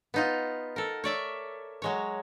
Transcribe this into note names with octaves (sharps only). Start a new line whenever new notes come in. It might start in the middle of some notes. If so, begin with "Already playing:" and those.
B3 D#4 F4
A4 A#4
C#5 D5 E5
F#3 G#3 C#5